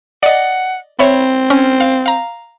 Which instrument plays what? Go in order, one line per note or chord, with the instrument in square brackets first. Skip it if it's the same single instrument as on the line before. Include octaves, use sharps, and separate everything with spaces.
[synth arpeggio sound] D5 D#5 [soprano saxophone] F#5
[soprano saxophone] C4 [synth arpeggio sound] C#5 E5 B5
[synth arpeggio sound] C#4
F5
F5 A#5